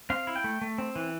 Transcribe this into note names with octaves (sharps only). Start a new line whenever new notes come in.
C4 F5
E4
G5
A3
A3
C4
E3